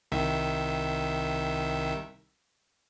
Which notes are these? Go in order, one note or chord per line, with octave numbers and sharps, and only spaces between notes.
C2 D#3 E5